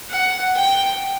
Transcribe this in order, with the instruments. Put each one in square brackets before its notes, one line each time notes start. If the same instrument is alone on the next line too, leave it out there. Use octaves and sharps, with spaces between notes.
[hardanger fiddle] F#5
G5